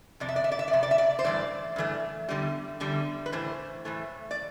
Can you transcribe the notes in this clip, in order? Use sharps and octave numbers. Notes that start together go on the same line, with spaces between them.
F2 C3 D5
E5
D5
E5
D5
E5
D5
F2 C3
D5
E5
D5
C5
G2 E3 A3 D5
G2 E3 A3
E2 D3 G3
E2 D3 G3
B4
A2 E3 A3 C5
A2 E3 A3
D5